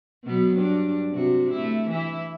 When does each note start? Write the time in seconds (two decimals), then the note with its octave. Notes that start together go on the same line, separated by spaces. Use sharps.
0.24 B2 F#3 B3
0.56 G2 D4
1.12 C3 F#4
1.51 A3 E4
1.90 E3 E4